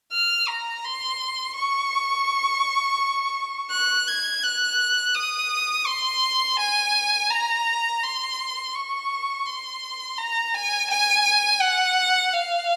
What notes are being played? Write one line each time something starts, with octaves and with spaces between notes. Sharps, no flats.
F6
A#5
C6
C#6
F#6
G#6
F#6
D#6
C6
G#5
A#5
C6
C#6
C6
A#5
G#5
G#5
F#5
F5